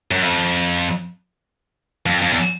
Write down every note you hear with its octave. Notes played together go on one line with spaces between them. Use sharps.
F#2
F2
F2
F2
E2